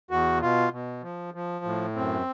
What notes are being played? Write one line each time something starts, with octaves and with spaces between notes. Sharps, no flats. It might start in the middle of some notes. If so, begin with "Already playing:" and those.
E2 F#4
B2 F4
B2
F3
F3
A2
F#2 C4